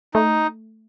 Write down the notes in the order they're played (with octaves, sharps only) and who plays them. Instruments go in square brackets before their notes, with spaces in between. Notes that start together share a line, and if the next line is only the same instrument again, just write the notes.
[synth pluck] A3 [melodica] D#4